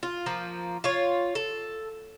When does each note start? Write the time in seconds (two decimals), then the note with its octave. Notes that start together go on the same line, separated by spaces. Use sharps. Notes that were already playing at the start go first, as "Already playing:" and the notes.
0.03 F4
0.26 F3 A#3
0.84 F4 C#5
1.35 A4